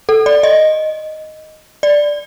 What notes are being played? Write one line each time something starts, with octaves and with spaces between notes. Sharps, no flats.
A4
D5
D#5
D5